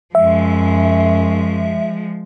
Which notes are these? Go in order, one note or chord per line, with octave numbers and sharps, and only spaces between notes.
F#2 F3 G#3 E5